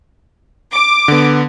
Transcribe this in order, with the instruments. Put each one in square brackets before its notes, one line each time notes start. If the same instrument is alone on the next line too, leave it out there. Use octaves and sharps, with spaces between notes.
[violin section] D6
[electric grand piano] D3 B3